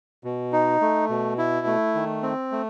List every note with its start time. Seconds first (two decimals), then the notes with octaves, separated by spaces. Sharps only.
0.24 B2
0.53 D#4
0.81 A3
1.09 B2
1.38 E4
1.66 A3
1.95 D#3
2.23 C4
2.52 A3